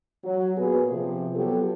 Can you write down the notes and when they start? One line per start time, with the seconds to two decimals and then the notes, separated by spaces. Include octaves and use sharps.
0.24 F#3
0.57 A#2 B3 G#4 B4
0.91 C3 F3
1.35 F#3 B3 F4 G4 A4